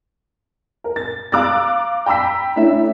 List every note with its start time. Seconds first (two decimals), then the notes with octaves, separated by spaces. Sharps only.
0.84 A#4
0.96 A6
1.32 F5 A#5 D6 E6 F#6 A6
2.06 G5 A#5 B5 E6 B6
2.56 A3 C#4 D4 E4 E5